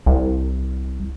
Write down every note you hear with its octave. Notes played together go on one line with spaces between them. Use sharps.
C2